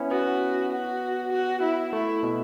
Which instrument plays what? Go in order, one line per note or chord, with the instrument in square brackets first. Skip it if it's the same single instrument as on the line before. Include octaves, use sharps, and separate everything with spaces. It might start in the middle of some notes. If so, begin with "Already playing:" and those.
Already playing: [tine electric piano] B3 C#4 E4
[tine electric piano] B3 [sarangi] F#4
[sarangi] F#4
F#4
E4
[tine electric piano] A3 [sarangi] E4
[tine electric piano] B2